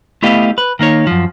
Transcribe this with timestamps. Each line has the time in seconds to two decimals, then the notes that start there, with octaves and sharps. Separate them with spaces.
0.23 A3 B3 E4 G4 D#5 F5
0.58 B4
0.79 D#3 A#3 D#4 C#5
1.07 F#2 F3